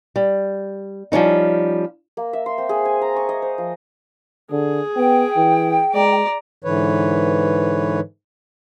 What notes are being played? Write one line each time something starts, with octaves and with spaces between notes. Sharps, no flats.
G3
F3 G3 C#4 D#4
A#3
E5
C6
C4
G#4
G#5
A#5
C#6
D#5
C5
F3
D3 G#4
B3 G5
E3
G#3 D5 A#5
G#2 D3 E3 B4 C#5